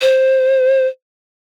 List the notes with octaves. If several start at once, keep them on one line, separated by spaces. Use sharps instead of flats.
C5